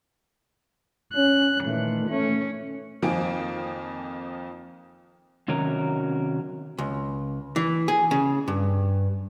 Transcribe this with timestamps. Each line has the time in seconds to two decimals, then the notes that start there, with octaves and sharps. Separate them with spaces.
1.14 C#4 F#6
1.65 A#2 D#3 E3 A3
2.10 A3 C#4
3.02 F2 D#3 F3 A#3 G#5 D7
5.48 C3 D#3 F#3 C#4 A#4 A#5
6.78 C#2
7.56 E3
7.88 G#4
8.11 C#3
8.48 G2